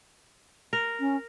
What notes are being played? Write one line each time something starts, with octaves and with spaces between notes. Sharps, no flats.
A#4
C#4